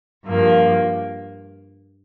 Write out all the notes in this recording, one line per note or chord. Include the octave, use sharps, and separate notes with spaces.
G2 F3 A#3